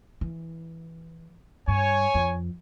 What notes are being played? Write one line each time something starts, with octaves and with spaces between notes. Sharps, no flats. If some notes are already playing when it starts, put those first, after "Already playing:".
E3
G2 C#5 G#5
F2